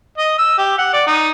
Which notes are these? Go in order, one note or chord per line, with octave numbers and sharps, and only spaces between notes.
D#5
E6
G4
F#5
D5
D#4